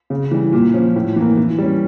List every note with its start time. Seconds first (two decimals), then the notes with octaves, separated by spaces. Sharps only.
0.10 C#3
0.31 E3 G3
0.53 A#2
0.74 F3 C#4
0.96 A2
1.16 E3 A#3
1.37 E3
1.58 G3 C#4